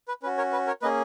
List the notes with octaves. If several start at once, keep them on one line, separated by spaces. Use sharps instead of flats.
B4
C#4 F#4 B4
A#4 C#5
B4
A#4 C#5
A#3 C#4 G#4 B4 D#5